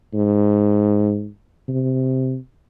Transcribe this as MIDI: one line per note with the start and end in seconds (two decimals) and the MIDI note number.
0.13 1.28 44
1.68 2.37 48